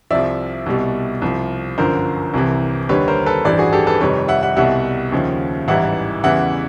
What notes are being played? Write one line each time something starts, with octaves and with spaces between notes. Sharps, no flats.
C2 C3 F3 D5 E5
C2 B2 G3
C2 C3 F3
G1 F#2 D3 F3 A#4 C5
C2 C3 E3
D#2 D3 G3 B4 C#5
A#4 C5
A4 B4
A1 G2 E3 G3 C5 D5
F#4 G#4
G4 A4
A4 B4
F2 C3 D#3 G3 B4 C#5
E5 F#5
E5 F#5
C2 B2 G3 E5 F#5
D#2 C#3 F3
A1 G#2 E3 G3 E5 F#5
E2 C#3 E3 G3 E5 F#5